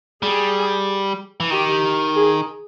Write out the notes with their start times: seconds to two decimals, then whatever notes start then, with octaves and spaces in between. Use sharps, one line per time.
0.23 G3 G#4
1.40 E3
1.50 D#3 G4
2.15 G#4